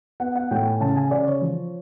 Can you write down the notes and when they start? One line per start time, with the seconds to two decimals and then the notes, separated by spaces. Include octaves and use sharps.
0.20 B3 F#5
0.35 F#5
0.51 A2 G5
0.66 G#5
0.81 C#3 A5
0.96 G#5
1.11 C#3 D5
1.27 C#5
1.42 F3